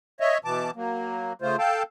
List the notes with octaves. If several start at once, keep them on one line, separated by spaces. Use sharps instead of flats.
C#5 D#5 E5
B2 E3 A5 D6
F#3 A#3
C#3 A3 F4 C5
A4 F5 G5 A5